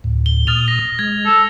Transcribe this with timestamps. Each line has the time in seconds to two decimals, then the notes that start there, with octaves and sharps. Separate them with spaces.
0.04 D2 A2
0.26 G7
0.47 A#2 D#6 F6 A6 F7
0.68 A#6
0.99 G#3 G#6
1.26 A4